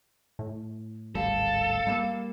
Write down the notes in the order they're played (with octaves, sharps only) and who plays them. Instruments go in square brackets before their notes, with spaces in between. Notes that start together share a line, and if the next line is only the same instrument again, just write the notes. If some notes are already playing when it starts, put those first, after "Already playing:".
[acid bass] A2
[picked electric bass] D1 G#1 G3 [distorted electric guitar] A4 [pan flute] F5
[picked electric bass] G3 A3 A#3